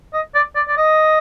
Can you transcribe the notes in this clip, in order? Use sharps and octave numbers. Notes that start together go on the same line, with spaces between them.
D#5
D5
D5
D5
D#5